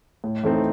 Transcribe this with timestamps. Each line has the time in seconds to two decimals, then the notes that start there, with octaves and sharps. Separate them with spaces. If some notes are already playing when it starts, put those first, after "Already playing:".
0.24 A2
0.43 E3 A3 C4 D#4